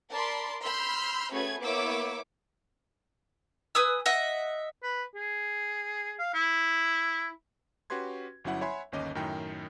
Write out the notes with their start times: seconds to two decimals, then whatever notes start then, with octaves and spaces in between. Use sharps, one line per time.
0.11 A#4 D5 A5 B5 C6
0.61 B5 C6 E6 F6 G6
1.32 A3 C#4 F#4 G#4 B4 G#6
1.61 A#3 B3 E4 C#5 D6 E6
3.75 B4 G#5 D#6 E6
4.06 D#5 E5 F#5
4.83 B4
5.15 G#4
6.19 F5
6.34 E4
7.90 C#4 F#4 G4 B4 C6 G#6
8.44 G1 F#3 C#4 E4 F#5
8.61 C#5 E5 F#5 G#5 B5 C6
8.92 G1 D#2 C#4 D#5 D6
9.15 F#2 A2 D#3 G5 G6